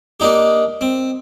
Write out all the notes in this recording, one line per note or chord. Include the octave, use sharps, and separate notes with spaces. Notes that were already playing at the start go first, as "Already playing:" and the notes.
A#3 D4 D#4 G4
C4